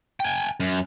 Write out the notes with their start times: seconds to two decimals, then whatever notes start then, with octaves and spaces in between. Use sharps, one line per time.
0.20 G5 G#5
0.60 F#2